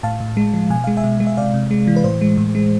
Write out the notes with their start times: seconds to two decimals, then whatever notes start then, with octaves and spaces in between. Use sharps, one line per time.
0.03 A2 F5 A5
0.20 A2
0.37 G#3
0.54 F3
0.70 B2 G#5
0.84 G#3 F5
0.97 E5 G#5
1.04 B2
1.20 G#3
1.27 E5
1.37 C3 D5 F5
1.54 C3
1.71 G#3
1.87 E3
1.96 B4
2.04 A2 C5
2.21 G#3
2.37 A2
2.55 G#3